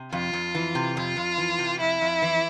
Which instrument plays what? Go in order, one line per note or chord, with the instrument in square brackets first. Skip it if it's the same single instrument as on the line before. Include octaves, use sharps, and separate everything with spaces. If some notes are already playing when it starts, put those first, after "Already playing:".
Already playing: [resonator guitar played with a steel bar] C3
[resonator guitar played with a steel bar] F2 [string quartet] F4
[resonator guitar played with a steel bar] F2
E3
C3
[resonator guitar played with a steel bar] F2 [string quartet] F4
[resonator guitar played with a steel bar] F2
E3
C3
[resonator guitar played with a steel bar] F2 [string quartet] E4
[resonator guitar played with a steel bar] F2
E3